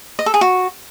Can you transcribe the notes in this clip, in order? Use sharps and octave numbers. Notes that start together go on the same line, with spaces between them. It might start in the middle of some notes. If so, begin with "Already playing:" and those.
D#5
A4
G#4
F#4